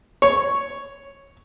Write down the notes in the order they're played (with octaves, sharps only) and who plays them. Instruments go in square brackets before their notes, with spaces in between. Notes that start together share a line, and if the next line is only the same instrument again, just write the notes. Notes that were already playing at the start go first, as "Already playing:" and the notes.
[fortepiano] C#5